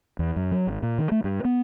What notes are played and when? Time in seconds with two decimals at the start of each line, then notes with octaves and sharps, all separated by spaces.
0.19 E2
0.36 F#2
0.52 F#3
0.67 G#1
0.83 A#2
0.98 D#3
1.12 A3
1.24 G2
1.45 B3